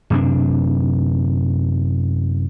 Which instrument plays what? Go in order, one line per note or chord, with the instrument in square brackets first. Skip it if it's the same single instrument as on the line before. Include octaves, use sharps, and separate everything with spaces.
[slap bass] F#2 C3 D4